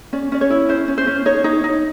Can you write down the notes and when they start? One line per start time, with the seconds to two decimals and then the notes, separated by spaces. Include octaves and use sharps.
0.13 C#4 D5
0.32 C#4 D5
0.41 C#5
0.50 E4
0.69 C#4 C5
0.88 C#4
0.98 C5
1.07 C#4
1.26 D#4 C#5
1.44 D#4 C#5
1.64 D#4